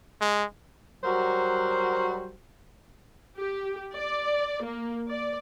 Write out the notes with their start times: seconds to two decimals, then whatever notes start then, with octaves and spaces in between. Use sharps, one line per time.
0.21 G#3
1.04 F#3 G3 F#4 A#4 C5
3.37 G4
3.94 D5
4.65 A#3
5.10 D5